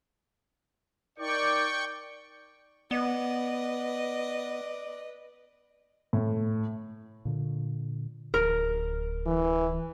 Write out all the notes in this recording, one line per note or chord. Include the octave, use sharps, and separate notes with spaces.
D#4 A#4 D5 G5 C#6
B3 B4 D5 D#5
A2
A#2 D3
D1 A#4
E3